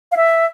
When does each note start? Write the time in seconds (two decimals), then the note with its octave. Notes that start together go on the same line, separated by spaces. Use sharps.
0.12 F5
0.17 E5